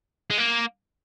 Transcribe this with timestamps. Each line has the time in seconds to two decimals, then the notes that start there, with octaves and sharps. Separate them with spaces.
0.30 G#3
0.38 A#3